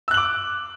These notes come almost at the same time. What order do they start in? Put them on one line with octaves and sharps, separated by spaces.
E6 F#6 F#7 D6